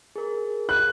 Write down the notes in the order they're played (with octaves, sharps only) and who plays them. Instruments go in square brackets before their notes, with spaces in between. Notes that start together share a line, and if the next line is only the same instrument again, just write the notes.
[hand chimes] G#4 A#4
[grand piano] F#6